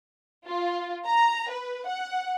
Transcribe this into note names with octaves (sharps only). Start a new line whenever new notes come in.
F4
A#5
B4
F#5